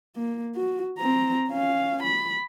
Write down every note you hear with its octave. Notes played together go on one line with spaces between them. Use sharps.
A#3
F#4
C4 A#5
C#4 F5
B5